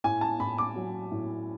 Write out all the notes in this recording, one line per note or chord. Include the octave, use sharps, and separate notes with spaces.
A2 G#5
A5
A2 B5
D6
F#3
A2